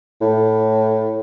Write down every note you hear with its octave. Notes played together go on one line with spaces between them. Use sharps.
A2